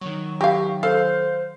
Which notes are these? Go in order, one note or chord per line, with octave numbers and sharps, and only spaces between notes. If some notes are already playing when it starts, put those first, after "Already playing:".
D#3 F#3 C#6
F#4 G4 F5
A4 C5 F5